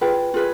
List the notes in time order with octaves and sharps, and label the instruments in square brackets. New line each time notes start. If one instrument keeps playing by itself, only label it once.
[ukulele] F4 G#4 B4 G5
F4 G#4 B4